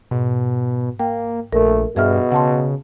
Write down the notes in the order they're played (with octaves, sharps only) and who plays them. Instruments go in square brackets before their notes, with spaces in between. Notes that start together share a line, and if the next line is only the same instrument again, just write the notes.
[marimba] G#2 [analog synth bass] B2
[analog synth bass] A#3 [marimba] G5
[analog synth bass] A#1 [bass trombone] A3 [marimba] A#4
[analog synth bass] G2 [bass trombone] B2 [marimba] G#4 E5 F6
[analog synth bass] C#3 [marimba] F#5 A5 C6